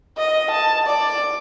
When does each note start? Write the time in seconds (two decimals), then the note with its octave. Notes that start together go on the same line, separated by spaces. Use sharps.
0.18 D#5
0.51 A5
0.87 D5